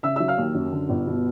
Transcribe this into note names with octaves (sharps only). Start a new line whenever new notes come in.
C#3 E5 E6
F#3 E5 E6
F5 F6
D#2
F#2
D3
G1
B2